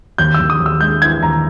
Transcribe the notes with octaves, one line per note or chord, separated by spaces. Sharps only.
D#2 G6
E6
D#2
D#6
D#2
E6
G#3 G6
E3 G#6
D#2 A#5